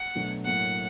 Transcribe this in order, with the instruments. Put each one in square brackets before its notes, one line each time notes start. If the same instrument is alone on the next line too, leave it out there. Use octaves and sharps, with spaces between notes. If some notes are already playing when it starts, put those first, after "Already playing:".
Already playing: [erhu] F#5
[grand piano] B2 F#3 A3 D4
[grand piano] A2 F#3 A#3 [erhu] F#5